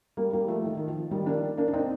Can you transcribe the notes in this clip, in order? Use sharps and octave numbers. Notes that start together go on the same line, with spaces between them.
G3 A#3
G3 A#3
F3 A3
D#3
D#3
F3
D#3 G3
A#3 D4
A#3 D4
D4
C4 D#4